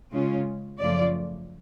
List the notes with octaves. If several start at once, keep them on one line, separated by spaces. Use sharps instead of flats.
C#3 G#3 C#4 F4
F#2 C#3 F3 A3 F4 D5